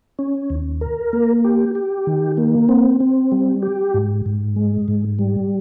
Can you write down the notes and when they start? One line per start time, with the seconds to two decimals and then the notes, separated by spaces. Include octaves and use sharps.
0.19 C#4
0.50 D#2
0.81 A#4
1.13 A#3
1.44 G4
1.75 G4
2.07 D#3
2.37 A#3
2.69 C4
3.00 C4
3.32 G3
3.62 G4
3.94 G#2
4.26 G#2
4.56 G#3
4.88 G#2
5.19 G3